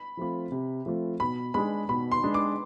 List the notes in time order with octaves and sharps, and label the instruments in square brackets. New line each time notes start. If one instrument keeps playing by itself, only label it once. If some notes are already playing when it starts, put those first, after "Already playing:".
Already playing: [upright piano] B5
[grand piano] F3 A3 C4 F4
C3
F3 A3 C4 F4
[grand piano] B2 [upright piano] B5
[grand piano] G#3 D4 G#4 [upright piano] B5
[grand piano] B2 [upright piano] B5
[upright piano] C6
[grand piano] G#3 D4 G#4
[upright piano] D6